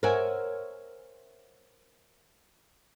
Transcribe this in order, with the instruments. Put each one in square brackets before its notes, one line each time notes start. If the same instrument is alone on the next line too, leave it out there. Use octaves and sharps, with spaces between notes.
[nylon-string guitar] A#4 C5 C#5 E5 F#5 G#5